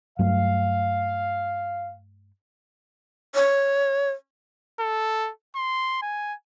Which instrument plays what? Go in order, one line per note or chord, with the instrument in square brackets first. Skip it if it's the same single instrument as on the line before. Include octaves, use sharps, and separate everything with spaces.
[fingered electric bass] G2 F#3 A3 [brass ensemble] F5
[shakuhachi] C#5
[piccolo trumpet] A4
C6
G#5